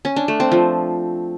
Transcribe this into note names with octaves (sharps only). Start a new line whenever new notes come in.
C#4
D4
A3
C4
F3